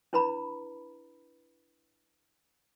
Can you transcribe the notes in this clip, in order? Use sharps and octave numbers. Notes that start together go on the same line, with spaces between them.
D4 E4 B4 A#5 B5